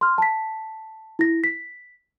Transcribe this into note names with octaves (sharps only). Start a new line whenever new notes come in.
C6 F6
A5 B6
E4 A#6
B6